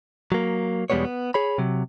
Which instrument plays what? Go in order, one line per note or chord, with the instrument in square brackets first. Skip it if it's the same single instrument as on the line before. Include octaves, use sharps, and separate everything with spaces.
[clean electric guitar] F#3 A#3
E2 B2 G3 G#3 B3 C#5
B3
G#4 C#5 B5
C3 F#3